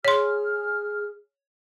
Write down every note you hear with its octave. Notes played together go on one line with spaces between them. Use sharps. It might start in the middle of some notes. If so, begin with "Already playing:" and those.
G#4 C#5 C6 F6